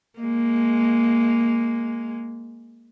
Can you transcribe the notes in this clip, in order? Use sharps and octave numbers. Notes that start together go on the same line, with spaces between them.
G#3 A#3